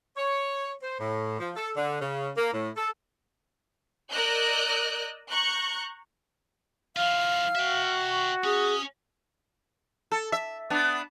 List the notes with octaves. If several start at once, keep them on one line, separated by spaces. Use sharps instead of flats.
C#5
C5
A2
F3
A4
D3
C#3
A#3
A2
A4
A#4 D5 D#5 E6 F#6 G6
A#5 C#6 F#6 G6
E3 F4 F5 F6
F#4 E5 G5
C#6
C#4 G#4 D#6
A4
E5
B3 D4